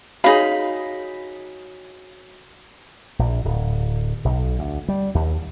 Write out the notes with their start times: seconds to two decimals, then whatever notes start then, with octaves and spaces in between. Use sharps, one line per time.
0.24 D#4 F#4 G#4 C#5 F5 G#5 B5
3.19 A#1
3.45 D1
4.25 B1
4.59 D2
4.88 G3
5.15 D#2